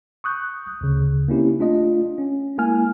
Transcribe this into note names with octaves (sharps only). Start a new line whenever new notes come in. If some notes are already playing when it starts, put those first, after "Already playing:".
C#6 D#6 F#6 G6
D2 C#3
A#3 C4 C#4 D#4 E4 G4
A3 D4 F4 D#5
C#4
G#3 A#3 E4 G#5 F6